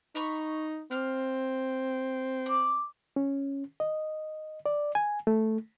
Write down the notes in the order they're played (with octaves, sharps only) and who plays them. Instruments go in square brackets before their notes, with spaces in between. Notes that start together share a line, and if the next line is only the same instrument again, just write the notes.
[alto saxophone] D#4 [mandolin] A#5 B5 C#6
[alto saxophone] C4 [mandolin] F5 F6
[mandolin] D5
[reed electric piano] C#4
D#5
D5
G#5
A3